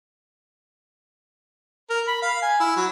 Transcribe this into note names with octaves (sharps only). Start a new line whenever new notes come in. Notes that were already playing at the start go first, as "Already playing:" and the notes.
A#4
B5
F5
G#5
E4
F#3